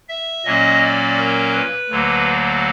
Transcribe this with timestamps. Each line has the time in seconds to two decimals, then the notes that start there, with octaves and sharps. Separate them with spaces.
0.08 E5
0.45 A#2 F#3 A#3 C#4 D#5
0.81 D5
1.18 A#4
1.53 B4
1.90 D2 D3 F#3 A#3